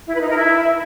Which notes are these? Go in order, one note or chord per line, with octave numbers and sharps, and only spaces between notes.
E4
B4
D#4
A#4
E4